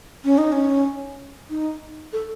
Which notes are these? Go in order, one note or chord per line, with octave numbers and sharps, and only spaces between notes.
C#4
D#4
C#4
D#4
A4